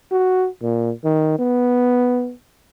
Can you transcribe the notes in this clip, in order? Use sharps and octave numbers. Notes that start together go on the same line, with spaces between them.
F#4
A#2
D#3
B3